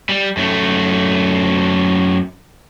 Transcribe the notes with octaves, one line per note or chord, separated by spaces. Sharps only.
G3
F#2 A3